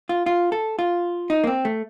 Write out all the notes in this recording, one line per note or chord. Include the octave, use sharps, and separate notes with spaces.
F4
F4
A4
F4
D#4
A#3
C4
A3